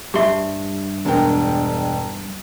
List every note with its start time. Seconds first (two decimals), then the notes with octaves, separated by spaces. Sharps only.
0.14 G2 G4 E5 C6
1.05 E1 G#3 D4 A#4 G5